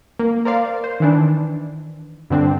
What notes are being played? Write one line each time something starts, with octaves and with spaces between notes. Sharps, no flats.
A#3
A#4 C5 D5 F5
C5
D#3 E3 D4
G2 D3 C4 D4